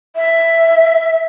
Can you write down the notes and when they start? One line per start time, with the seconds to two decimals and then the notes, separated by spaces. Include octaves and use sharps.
0.16 E5